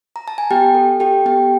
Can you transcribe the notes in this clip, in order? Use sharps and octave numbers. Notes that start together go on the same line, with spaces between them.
A#5
A5
G#5
B3 G4 G5
A4
G4 A4 G5
B3 G4 G5